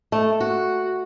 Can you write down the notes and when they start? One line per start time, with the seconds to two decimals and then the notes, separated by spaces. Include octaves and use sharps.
0.12 A3
0.41 F#4